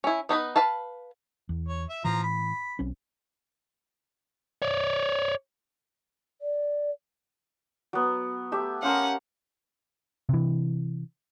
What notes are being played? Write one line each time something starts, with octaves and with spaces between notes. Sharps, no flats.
C#4 E4
B3 D#4 B4 B5
B4 F5 A5
E2
C#5
E5
A2 E3 F3 A#5
B5
B1 C4 C#4
C#5 D5
D5
F#3 B3
A3 G4 E5
C#4 A#4 C5 F5 F#5
C3 E3